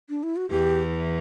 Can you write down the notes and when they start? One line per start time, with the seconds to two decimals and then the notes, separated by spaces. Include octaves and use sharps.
0.09 D4
0.23 E4
0.36 F#4
0.50 E2 E3 G4